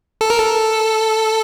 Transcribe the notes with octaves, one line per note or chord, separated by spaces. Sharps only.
A4
A#4
A4